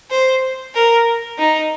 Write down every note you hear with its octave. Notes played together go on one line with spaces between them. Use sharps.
C5
A#4
D#4